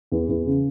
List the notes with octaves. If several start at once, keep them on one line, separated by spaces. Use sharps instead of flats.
E2
E2
C#3